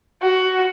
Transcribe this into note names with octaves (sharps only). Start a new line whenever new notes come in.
F#4